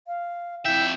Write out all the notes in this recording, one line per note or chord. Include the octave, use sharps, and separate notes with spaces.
F5
F2 E4 E5 G5